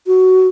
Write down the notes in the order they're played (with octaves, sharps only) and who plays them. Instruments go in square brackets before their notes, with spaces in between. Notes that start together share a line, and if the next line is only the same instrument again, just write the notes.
[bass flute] F#4